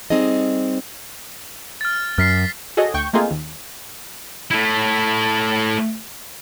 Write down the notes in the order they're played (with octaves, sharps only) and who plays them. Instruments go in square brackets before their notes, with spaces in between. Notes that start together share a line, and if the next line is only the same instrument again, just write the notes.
[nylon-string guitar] G3 C4 D#4 G#4 D#5
[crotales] F6 A6
[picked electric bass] F#2 [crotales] F6 B6 C7
[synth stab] F#4 G#4 A4 C#5 D#5
D2 G5 C#6 G6
A3 A#3 C4 D#4 F4 G#4
D#2
[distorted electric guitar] A3 E4